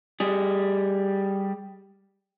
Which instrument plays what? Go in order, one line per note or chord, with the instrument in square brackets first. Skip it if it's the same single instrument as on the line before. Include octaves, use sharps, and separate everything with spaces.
[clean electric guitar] G3 G#4